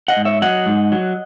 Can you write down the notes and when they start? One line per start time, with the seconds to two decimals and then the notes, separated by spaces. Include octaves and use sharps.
0.08 D#5 F#5
0.17 G#2
0.25 C#5 E5
0.42 F#3 D#5 F#5
0.66 G#2
0.92 F#3